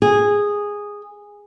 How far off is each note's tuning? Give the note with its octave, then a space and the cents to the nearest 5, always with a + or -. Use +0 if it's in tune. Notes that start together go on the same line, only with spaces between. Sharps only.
G#4 -10